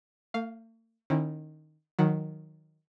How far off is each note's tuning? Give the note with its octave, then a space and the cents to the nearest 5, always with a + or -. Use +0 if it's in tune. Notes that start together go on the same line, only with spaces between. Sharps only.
A3 +45 F5 +0
D#3 -10 C#4 -40 E4 +0
D#3 +0 F#3 -20 F#5 +0